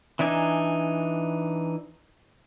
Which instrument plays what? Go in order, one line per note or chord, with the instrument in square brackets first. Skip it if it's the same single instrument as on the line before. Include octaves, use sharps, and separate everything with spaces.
[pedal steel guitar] E3 D4 D#4 G#5